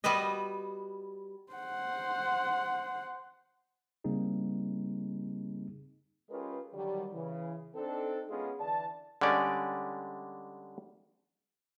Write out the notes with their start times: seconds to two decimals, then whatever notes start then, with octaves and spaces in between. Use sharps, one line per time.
0.04 G3 B3 F#4 B4 D#5
1.53 C5 F#5
4.04 C#3 G3 A#3 C4 D#4 G#4
6.30 G#3 C#4 F4 G4 A#4 B4
6.74 D3 D#3 F#3 G3
7.14 C#3 E3
7.76 C4 D4 D#4 A4
8.29 G#3 B3 C#4 F4 G#4
8.60 D3 E3 D5 A5
9.21 D3 G3 G#3 C#4 D5